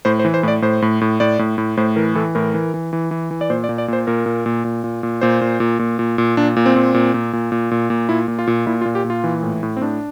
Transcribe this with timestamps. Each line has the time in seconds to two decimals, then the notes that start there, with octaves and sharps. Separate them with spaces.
0.05 A2 C5
0.19 C5
0.25 E3
0.34 C5
0.43 A2 D5
0.62 A2 C5
0.82 A2
1.01 A2
1.20 A2 D5
1.39 A2
1.58 A2
1.77 A2 C5
1.96 E3 A#4
2.15 E3 A4
2.35 A2 A#4
2.54 E3
2.74 E3
2.93 E3
3.11 E3
3.31 E3
3.41 D5
3.50 A#2 C5
3.64 D5
3.69 A#2
3.78 D5
3.88 A#2 C5
4.07 A#2 A#4
4.26 A#2
4.46 A#2
4.65 A#2
4.84 A#2
5.03 A#2
5.21 A#2 C5
5.41 A#2
5.60 A#2
5.79 A#2
5.99 A#2
6.18 A#2
6.37 A#2 D4
6.56 A#2
6.66 C4
6.76 A#2
6.94 A#2
7.14 A#2
7.33 A#2
7.52 A#2
7.71 A#2
7.90 A#2
8.09 A#2 E4
8.28 A#2
8.39 F4
8.47 A#2
8.67 A#2 E4
8.81 F4
8.85 A#2
8.95 G4
9.04 A#2
9.10 F4
9.24 E3
9.43 A2
9.63 A2
9.77 C4
9.81 A2 D4